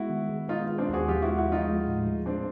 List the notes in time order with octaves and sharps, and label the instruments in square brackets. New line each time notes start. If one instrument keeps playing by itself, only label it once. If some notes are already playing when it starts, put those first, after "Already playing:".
Already playing: [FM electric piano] G#3 B3 [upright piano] E4 F#4
[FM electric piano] D#3
G#3
[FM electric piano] B3 [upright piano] D#4 F4
[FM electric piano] G#3
[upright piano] C4 D4
[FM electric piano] D#2 [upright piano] F#4 G#4
[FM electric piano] F3 [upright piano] F4 G4
[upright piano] E4 F#4
[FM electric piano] G#3
[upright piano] E4 F#4
[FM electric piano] F3 [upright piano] D#4 F4
[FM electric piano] G#3
A2
G#3
[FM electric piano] G#3 [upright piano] C4 D4